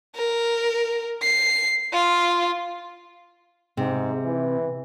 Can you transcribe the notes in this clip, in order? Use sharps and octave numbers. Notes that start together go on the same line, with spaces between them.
A#4
C7
F4
G#2 C3
E3